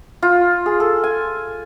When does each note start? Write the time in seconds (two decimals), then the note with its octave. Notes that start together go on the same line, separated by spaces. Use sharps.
0.23 F4
0.66 G#4
0.80 A4
1.04 G#5